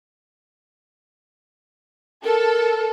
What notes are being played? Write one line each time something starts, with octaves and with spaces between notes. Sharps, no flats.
A4 A#4